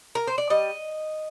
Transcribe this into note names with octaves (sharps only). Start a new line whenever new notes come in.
A#4
C5
D5
G3 D#5